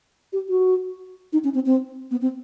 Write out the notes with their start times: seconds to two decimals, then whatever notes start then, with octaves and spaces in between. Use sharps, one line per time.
0.33 G4
0.49 F#4
1.33 D#4
1.44 C#4
1.54 C4
1.66 C4
2.11 B3
2.22 C4